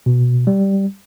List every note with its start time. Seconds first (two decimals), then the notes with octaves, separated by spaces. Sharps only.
0.06 B2
0.47 G3